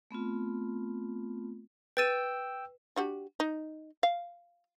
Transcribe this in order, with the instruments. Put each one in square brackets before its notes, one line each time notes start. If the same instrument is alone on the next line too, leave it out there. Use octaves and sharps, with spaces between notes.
[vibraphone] A3 B3 C4 F4
[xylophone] B4 A6 D#7 [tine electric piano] G5 E6
[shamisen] D4 F#4 G4
D#4
F5